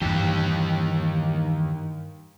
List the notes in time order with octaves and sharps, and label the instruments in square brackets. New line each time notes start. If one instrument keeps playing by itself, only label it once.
[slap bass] G2 E3 [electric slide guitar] D#3 D#4 G4